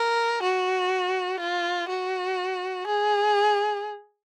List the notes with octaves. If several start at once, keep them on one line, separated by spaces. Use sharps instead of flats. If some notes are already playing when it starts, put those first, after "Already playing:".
Already playing: A#4
F#4
F4
F#4
G#4